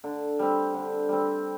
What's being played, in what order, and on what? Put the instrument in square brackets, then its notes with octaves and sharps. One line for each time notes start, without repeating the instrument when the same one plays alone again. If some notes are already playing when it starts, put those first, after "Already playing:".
[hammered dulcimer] D3
G3 C4
D3
G3 C4